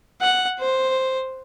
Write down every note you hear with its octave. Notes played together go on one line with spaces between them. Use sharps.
F#5
C5